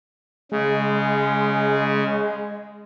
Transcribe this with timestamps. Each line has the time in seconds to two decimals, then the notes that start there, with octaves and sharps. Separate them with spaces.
0.52 C#3 G#3